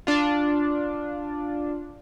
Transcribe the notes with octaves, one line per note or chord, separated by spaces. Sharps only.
D4 F4